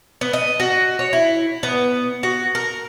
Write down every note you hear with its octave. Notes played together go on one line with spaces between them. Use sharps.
B3
D#5
F#4
C#5
E4
B3
F#4
A#4